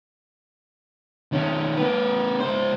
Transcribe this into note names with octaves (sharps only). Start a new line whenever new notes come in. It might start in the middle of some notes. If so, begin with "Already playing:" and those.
D#3 C#4
A#3 B4
C#2 C5